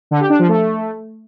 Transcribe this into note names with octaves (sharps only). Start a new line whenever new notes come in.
D3
G4
D4
F3
A3